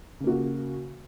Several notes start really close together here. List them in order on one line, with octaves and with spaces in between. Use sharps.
C#3 A#3 F#4